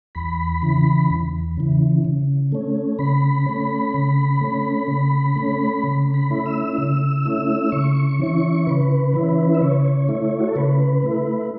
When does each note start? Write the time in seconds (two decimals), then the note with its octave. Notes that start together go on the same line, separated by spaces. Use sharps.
0.15 E2 B5
0.62 C#3 E3
1.10 E2
1.57 C#3 E3
2.05 C#3
2.52 A3 C#4
2.99 C#3 B5
3.46 A3 C#4
3.94 C#3
4.41 A3 C#4
4.88 C#3
5.36 A3 C#4
5.83 C#3
6.14 B5
6.30 A3 C#4 E4
6.46 E6
6.78 C#3
7.25 A3 C#4 E4
7.72 C#3 C#6
8.19 E3 C#4 E4
8.66 C#3 B4
9.13 E3 C#4 E4
9.55 E5
9.61 C#3 C#5
10.08 A3 E4
10.40 F#4
10.48 A4
10.56 C#3 B4
11.03 A3 E4